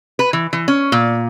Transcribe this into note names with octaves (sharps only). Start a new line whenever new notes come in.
B4
E3
E3
C#4
A#2